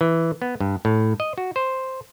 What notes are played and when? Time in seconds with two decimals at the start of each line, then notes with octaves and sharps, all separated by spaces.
0.01 E3
0.42 B3
0.60 G2
0.85 A2
1.20 D#5
1.38 F#4
1.56 C5